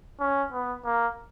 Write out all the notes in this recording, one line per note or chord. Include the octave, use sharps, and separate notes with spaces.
C#4
B3
A#3